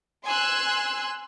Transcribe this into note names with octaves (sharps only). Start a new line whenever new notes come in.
G#5 C6 E6 F#6